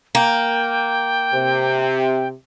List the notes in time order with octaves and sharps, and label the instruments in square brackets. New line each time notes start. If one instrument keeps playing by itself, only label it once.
[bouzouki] A#3 [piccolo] G5
[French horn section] C3